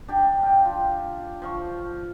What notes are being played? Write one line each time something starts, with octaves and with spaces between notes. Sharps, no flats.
D4 G4
F5 G5
F4
F3 F5 C#6